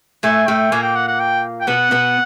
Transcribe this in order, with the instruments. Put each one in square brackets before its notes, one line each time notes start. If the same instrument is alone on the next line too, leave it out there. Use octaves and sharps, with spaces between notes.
[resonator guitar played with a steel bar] A2 A3 [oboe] G#5
[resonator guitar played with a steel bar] A2 A3 [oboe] G5
[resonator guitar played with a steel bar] A#2 A#3 [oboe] G#5
[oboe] G5
F#5
F#5
G5
G5
[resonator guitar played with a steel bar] B2 B3 [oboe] F#5
[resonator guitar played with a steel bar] B2 B3